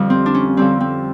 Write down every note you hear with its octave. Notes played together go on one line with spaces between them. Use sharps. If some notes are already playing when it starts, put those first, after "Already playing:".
Already playing: F2 D3 G3
C4
D4
C#4
F2 D3 G3 C4
C4